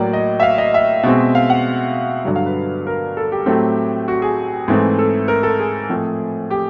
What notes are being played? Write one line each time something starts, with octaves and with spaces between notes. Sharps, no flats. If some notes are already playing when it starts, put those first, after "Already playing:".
Already playing: A2 F#3 A#3 D5
D#5
E5
F5
D#5
E5
B2 G#3 C4
F5
F#5
G2 D3 F#3
F5
B4
A#4
A4
G4
A2 F#3 A3 C4
F#4
G#4
G#2 E3 A3 C4
A4
A#4
A4
G#4
A2 F3 A3 C4
G4